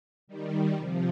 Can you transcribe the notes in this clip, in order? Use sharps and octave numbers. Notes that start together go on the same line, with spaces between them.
D#3 G3
C3 F3